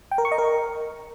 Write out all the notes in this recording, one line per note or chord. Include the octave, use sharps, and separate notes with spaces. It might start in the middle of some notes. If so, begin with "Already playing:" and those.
G5
A#4
C#6
D#5
A#4